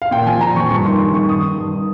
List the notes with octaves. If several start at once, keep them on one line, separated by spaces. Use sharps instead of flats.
F5
A#2 G5
F3 G#5
A#2 A#5
F3 C#6
G2 C#6
D#3 C6
G2 C6
D#3 C#6
G2 D#6
D#3
G2
D#3